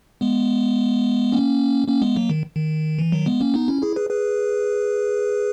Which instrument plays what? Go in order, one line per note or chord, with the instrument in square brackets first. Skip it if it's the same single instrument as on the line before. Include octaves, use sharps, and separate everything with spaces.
[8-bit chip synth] G#3 B3
A#3 C#4
A#3 C#4
G#3 B3
F#3 A#3
D#3
D#3
E3
D#3 F#3
G#3 B3
A#3 C#4
B3 D#4
C#4 E4
E4 G#4
G#4 B4
G#4 B4